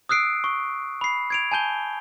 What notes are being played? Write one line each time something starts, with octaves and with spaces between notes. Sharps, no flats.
D#6 E6 F#6 C7 D7
C#6
B5 C7
G#6 D7 F7
G#5 A5 G6 G7